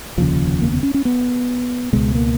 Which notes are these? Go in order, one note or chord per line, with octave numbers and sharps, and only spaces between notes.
F1 D#2 C#3 F3
A#3
B3
C#4
C#4
B3
C#2 B2 G#3
A#3